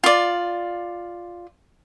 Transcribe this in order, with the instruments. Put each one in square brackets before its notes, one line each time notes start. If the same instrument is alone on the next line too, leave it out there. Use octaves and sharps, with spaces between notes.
[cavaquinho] F4 D5